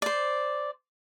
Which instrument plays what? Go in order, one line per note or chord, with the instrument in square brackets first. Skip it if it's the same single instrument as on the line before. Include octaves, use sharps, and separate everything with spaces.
[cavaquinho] C5 D5